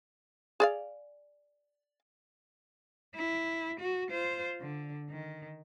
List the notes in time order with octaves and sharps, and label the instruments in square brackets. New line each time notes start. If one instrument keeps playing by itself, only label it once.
[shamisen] G#4 D5 F5
[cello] E4
F#4
F4 C5
D3
D#3